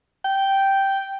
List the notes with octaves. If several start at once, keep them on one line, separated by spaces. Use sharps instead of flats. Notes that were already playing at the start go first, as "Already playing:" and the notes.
G5